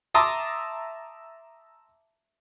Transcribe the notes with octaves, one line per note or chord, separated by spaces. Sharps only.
E5 A5 A#5 C6 D6 D#6